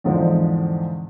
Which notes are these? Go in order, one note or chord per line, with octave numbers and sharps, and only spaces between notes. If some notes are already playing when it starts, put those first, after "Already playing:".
E2 G#2 D3 F3 G#3 C4